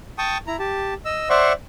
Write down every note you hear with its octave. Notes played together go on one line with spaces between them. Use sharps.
G5 A5 C#6 D#6
E4 A#5
G4 A5
D#5 E6
C5 D5 E5 F#5 C6 C#6